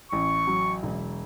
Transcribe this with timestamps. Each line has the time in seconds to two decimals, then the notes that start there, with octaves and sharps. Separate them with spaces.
0.12 A1 C#6
0.47 F#3
0.83 E1